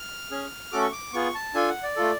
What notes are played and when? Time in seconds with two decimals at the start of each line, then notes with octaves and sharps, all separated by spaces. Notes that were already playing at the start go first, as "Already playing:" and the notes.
Already playing: F6
0.31 C#4 G#4
0.72 A3 C#4 F#4 A4 D6
0.82 C#6
0.92 D6
1.13 B3 F4 G#4 C#6
1.35 A5
1.55 D4 F4 A4 G#5
1.69 F#5
1.83 D5
1.96 A3 F4 A4